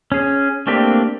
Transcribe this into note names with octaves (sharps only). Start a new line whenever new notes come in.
C#4 G#4
A3 A#3 C4 D4 G4